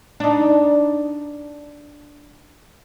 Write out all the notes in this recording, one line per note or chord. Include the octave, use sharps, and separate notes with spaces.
D4 D#4